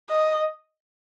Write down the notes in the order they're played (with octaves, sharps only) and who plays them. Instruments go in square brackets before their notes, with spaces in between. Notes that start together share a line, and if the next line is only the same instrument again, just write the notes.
[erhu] D#5